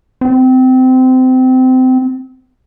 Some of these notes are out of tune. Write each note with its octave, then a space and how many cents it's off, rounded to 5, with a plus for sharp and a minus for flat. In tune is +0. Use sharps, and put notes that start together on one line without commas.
C4 -25